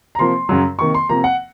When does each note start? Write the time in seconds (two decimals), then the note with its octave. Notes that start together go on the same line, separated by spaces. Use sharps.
0.15 A#5
0.19 C3 F3 A#3 C6
0.49 F#2 C#3 F#3
0.79 C3 D#3 A#3 C#6
0.94 C6
1.09 C3 F3 A#3 A#5
1.24 F#5